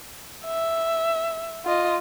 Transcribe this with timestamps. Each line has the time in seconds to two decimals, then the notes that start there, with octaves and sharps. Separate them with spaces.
0.45 E5
1.65 F4 D#5